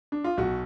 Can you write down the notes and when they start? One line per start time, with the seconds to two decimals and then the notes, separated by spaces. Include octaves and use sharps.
0.12 D4
0.24 F4
0.37 B1 F#4